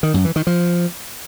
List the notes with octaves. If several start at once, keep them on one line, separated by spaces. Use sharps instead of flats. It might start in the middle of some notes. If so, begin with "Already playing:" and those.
D#3
F#2
E3
D#3
F3